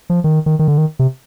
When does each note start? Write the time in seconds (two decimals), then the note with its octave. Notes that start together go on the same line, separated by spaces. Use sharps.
0.10 F3
0.24 D#3
0.46 D#3
0.59 D#3
0.68 D3
0.78 D#3
0.99 C3